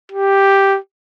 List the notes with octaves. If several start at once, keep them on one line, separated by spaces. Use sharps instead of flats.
G4